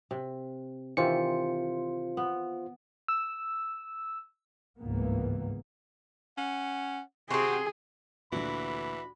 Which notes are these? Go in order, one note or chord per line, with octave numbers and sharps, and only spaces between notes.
C3
C3 D#3 E3 F4 C5 C#7
B3
E6
G1 C#2 G#2 E3 A#3 B3
C#4 F#5
C3 C4 F#4 G#4 C6
D2 A#2 E3 D4 F#4 B5